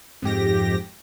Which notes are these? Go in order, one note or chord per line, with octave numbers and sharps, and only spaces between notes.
F2 G#2 G4 A#6